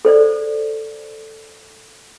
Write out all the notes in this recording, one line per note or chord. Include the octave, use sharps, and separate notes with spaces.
A4 C5 D5